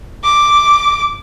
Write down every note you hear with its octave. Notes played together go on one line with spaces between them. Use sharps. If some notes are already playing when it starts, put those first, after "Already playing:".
D6